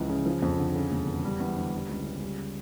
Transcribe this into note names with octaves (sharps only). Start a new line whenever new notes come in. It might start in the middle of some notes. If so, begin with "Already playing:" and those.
Already playing: C#2 E3 F3
C#3
F3
F2
D3
C#3
E1
E2
G3
E2
D3
G3
C#2
C#3
G3